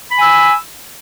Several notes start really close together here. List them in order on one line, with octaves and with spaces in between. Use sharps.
B5 G#5 E6